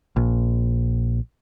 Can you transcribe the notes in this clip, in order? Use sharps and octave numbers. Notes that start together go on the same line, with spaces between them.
A#1